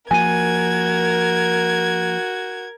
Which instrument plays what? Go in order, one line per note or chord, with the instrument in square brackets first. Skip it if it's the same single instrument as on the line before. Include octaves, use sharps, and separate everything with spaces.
[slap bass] F3 A#3 [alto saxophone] F#4 [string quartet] A#4 G#6 [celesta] G#5 D#7